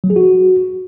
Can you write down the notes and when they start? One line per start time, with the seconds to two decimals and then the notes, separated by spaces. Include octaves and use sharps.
0.04 F#3
0.10 G#4
0.16 F#4